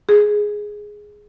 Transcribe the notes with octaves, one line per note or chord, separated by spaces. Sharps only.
G#4